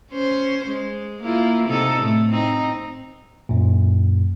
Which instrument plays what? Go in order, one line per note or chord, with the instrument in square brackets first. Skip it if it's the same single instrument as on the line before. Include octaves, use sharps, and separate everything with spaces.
[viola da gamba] C#4 C5
G#3
A#3 E4 F4
C3 D#4 A4
A2 A3
C4 D#4
[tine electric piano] F#2 A#2